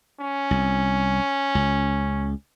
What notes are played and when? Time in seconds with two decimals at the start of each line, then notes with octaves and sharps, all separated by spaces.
0.20 C#4
0.51 C2
1.55 C#2